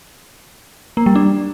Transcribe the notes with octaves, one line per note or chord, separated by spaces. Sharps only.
A#3
G3
D4